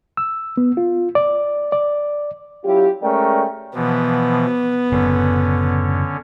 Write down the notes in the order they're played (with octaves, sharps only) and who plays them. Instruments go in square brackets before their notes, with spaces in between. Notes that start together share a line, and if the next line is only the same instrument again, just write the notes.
[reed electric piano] E6
B3
F4
D5
D5
[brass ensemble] F#3 C#4 E4 F4 G4
G#3 A3 C#4 A#4 D5 G5
[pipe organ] B2 E3 F3 [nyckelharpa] B3
[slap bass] F#1 F#2 A2 [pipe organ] D3 C#4